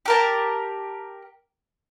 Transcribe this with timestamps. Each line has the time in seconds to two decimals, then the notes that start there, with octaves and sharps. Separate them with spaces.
0.06 G4 A#4 A5